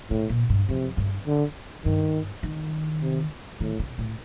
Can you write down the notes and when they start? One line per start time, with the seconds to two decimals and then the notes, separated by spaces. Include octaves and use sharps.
0.10 A2 C3
0.29 A#2
0.50 G2
0.69 F2 C3
0.97 G2
1.26 D3
1.85 G2 D#3
2.43 D#3
3.01 C3
3.60 A2 D#3
3.79 C3
3.98 A2